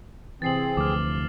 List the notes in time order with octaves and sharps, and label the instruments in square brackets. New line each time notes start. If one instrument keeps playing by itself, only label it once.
[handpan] C3 E3 [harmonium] C4 G#4 [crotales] A6 C7 F#7
[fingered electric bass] D2 [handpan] F3 [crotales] D6 F6